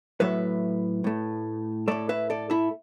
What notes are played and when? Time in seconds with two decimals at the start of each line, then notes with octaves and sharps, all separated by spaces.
0.20 A2 F#3 A3 B4 E5
1.04 A2 A3
1.88 A2 A3 A4 D5
2.09 B4 E5
2.30 A4 D5
2.50 E4 A4